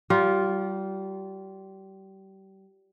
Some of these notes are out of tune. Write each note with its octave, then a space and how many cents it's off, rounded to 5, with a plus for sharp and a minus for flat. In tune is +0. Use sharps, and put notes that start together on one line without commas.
G3 -30 F4 +0